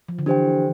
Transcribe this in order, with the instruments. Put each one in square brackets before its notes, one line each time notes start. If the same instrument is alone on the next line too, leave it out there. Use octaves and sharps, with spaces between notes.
[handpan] F3
D3
[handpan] E3 [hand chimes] D4 G4 C5 G5